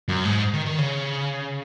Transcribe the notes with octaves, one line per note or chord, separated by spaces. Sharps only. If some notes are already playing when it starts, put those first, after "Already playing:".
F#2
G#2
D#3
D#3
C#3